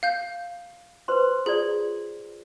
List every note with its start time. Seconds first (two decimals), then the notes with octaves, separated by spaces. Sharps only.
0.03 F5 G6
1.08 B4 C5 C6
1.46 F4 G#4 D5